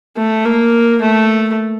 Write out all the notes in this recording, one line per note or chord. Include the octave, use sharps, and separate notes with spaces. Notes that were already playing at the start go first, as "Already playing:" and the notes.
A3
A#3
A3